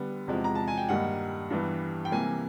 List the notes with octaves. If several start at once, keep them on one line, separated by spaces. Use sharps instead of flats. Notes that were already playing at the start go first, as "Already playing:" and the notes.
Already playing: D3 G3 B3
E2 C3 F3 G#3
A#5
A5
G#5
G5
G2 D#3 G3 A#3 D#4 F#5
G2 E3 G3 B3
G5
C3 E3 G3 A#3 G#5